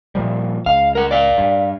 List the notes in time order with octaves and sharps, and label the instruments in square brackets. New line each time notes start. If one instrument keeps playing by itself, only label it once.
[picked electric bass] A#2 F3 G3
[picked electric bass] C#2 [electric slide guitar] F5
[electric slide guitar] A#4 F#5
D5 F5
[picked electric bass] G2